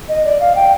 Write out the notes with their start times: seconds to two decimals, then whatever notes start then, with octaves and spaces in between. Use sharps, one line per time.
0.09 D#5
0.25 D5
0.40 F5
0.55 G5